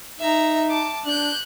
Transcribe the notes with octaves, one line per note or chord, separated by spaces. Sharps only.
D#4 E5 A#5
A5 D6
D4 F#6 G6